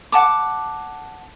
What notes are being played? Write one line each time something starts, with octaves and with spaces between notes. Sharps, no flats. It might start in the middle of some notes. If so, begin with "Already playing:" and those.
F#5 A5 D6